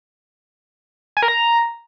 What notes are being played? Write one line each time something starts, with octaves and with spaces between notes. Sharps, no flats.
G#5
A#4
A#5